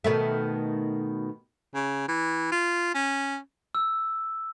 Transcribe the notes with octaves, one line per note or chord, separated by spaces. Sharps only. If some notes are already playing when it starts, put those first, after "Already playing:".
B2 D#3 A3
C#3
E3
F4
C#4
E6